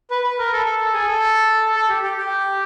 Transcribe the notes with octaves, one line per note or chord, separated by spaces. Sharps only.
B4
B4
A#4
A4
A4
A4
G#4
A4
A4
G4
G4
G4